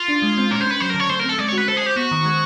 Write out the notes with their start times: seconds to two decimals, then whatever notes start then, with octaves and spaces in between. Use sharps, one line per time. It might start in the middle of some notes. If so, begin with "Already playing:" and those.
Already playing: F4
0.08 D4
0.22 G#3
0.37 C4
0.51 C#4 A#4
0.62 C5
0.66 C#4 B4
0.80 F#3 C5
0.90 D3 A#4
1.00 C#5
1.09 A3 C5
1.20 C4 A#4
1.29 A4
1.39 G#3 D5
1.48 C#5
1.53 F#4 B4
1.68 A4 C5
1.76 G#4
1.82 G4 C5
1.96 B3 F#4
2.11 D#3
2.26 G#3